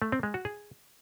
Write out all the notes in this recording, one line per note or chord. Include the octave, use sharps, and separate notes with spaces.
A3
C4
G#3
F#4
G#4